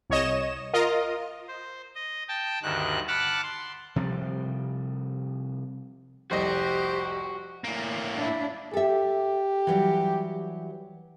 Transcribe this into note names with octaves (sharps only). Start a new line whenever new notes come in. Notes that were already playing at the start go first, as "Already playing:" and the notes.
C2 C#5 D#5 E7
F4 A#4 D#5
C5
D#5
G5 A5
D2 G2 D#3 F#6
F#5 A5 B5 D6 F6 F#6
C6
C3 F3 G3
F1 C2 F#4 G4 C5 D#5
A2 A#3
D4 E4
G4 A4 E5
E3 F#3 G3